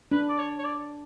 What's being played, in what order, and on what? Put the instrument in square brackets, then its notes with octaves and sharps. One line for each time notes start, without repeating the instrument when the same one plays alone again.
[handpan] D4 [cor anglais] B4
[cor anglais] D5
C#5
C#5
D5